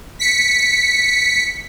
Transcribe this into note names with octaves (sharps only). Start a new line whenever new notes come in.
B6 C#7